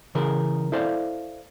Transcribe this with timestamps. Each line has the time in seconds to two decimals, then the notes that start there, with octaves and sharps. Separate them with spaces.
0.15 C#3 E3 G#4 A#4
0.72 E4 A4 C5 D5 F5